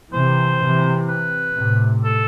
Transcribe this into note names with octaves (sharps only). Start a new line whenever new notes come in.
C3 E3 C5
C3 E3
B4
A2 C3
A4